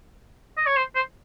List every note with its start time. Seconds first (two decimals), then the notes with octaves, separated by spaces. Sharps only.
0.57 D#5
0.67 C#5
0.77 C5
0.95 C5